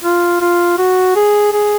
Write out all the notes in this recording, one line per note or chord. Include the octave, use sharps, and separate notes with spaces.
F4
F4
F#4
G#4
G#4